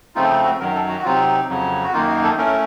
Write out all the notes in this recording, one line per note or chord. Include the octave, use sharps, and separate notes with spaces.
C#3 F3 A3 C4 D#4 F4
D#4
F#4
F#2 D#3 F#3 A#4
A4
F#4
F#4
C3 F#3 C4 D#4 F4
F2 C#3 F#3
F#4
F#2 D#3 A#3 D#4 F4
F#4
A4
A2 A3 C#4 A#4